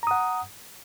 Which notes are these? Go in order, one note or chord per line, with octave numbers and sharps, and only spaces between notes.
F#5 A#5 D#6